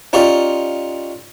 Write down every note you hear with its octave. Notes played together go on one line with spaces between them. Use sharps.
C#4 D#4 F4 G4 D5